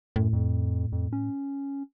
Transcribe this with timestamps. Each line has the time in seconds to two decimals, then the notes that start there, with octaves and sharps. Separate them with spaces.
0.16 F#2 A2
0.33 F2
0.92 F2
1.13 C#4